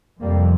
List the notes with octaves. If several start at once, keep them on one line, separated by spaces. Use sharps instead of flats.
F2 C3 G3 A#3